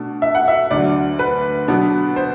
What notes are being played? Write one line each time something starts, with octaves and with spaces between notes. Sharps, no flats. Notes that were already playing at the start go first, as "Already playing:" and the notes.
Already playing: B2 A3 D4
E5
F#5
E5
D2 D3 F#3 D5
B4
B2 F#3 B3 D4
C5